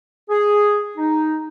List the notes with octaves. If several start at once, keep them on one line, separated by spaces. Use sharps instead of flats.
G#4
D#4